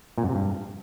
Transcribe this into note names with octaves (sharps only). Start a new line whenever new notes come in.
A#2
F#2
C3
G2